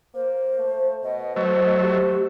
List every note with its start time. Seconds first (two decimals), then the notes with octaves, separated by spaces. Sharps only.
0.15 A#3 C5
0.59 A3
1.03 B2 D#5
1.36 F#3 A3 C5
1.81 G4